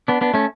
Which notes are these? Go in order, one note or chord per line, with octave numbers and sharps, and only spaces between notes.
B3 D4
B3 D4
A3 C#4